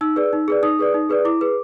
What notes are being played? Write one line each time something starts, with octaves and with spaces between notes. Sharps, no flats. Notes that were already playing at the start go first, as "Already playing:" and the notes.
D#4 E6
G#4 B4 D5
D#4
G#4 B4 D5
D#4 D#6
G#4 B4 D5
D#4
G#4 B4 D5
E4 D6
G#4 B4